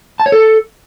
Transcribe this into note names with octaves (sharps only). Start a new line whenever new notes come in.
A5
C#5
A4